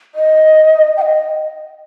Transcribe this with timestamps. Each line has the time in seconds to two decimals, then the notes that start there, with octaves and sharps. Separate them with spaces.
0.15 D#5
0.97 G5
1.02 D#5